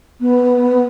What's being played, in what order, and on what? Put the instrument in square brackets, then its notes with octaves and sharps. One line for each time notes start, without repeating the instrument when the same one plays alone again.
[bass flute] B3